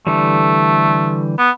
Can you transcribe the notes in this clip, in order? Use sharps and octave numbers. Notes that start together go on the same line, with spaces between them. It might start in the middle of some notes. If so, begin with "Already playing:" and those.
D3 E3 G3 A3
B3